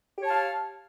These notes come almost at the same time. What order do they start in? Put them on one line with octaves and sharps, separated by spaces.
G4 C#5 A5 F5